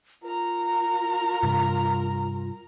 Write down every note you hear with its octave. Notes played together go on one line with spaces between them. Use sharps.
F4 A#4 A#5
G2 C3